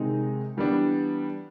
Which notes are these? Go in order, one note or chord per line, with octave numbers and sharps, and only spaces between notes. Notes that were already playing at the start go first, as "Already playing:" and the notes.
Already playing: C3 D#3 G#3 C4 D#4
E3 G3 B3 D4